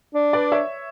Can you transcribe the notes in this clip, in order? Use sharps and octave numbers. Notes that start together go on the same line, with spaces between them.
D4
B4 D5
C#5 E5